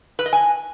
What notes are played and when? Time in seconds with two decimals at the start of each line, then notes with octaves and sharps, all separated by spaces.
0.19 B4
0.26 D#5
0.33 G#5